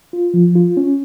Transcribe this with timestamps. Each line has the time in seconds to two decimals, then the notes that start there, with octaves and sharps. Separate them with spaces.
0.13 F4
0.34 F3
0.55 F4
0.77 C#4